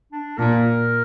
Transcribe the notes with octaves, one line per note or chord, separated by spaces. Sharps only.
D4
A#2 A#4